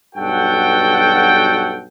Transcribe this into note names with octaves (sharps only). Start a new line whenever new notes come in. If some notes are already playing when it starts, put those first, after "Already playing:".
B1 G2 F#4 A4 F#5 G5